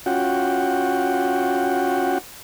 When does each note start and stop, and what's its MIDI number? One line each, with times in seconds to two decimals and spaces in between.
0.06 2.18 61
0.06 2.18 65
0.06 2.18 66
0.06 2.18 78
0.06 2.18 79